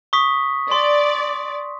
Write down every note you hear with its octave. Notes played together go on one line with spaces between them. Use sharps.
C#6 D#6 B6
D5 C6